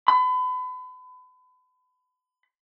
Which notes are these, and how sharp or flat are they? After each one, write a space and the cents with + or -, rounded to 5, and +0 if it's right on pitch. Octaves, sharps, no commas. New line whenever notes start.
B5 +35